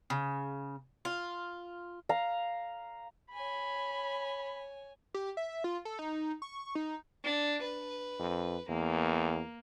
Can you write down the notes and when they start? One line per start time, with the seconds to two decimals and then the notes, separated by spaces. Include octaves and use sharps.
0.10 C#3
1.05 F4
2.09 F5 A#5
3.33 C#5 G#5 B5
5.14 G4
5.37 E5
5.64 F4
5.85 A4
5.99 D#4
6.42 C#6
6.75 D#4
7.24 D4
7.61 B4
8.20 F2
8.69 E2 A#3